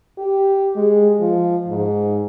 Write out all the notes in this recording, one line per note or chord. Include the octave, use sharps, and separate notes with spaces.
G4
G#3
F3
G#2